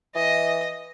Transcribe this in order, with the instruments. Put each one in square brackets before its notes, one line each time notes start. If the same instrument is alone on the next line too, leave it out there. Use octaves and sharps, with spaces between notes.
[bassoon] E3 [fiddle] D#5